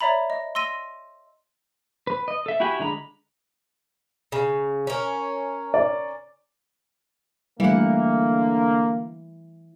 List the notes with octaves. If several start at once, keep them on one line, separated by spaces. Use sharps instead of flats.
C#5 D5 E5 A#5 B5
D#5
C6 E6 A#6 D#7 G7
B4
D#5
A4 E5
E4 F#4 G4 G#5 B5
D3 G#3 A#5 B5
C#3
C#4 A#4
D5
D3 E3 G3 A3 A#3 F#5